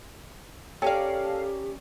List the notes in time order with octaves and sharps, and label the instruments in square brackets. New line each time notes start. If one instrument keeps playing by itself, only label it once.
[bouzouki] C#4 A#4 D5 [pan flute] G4 [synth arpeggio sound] A4 F5 [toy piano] G5